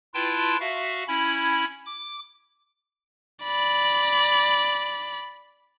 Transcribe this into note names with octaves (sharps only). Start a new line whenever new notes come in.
E4 F4 B4 G5 A5 C6
F#4 E5 F5
C#4 E4 B5 G#6
D6
D5 B5